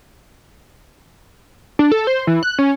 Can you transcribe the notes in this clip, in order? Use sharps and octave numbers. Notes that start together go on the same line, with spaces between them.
D4
A4
C5
E3
F#6
C#4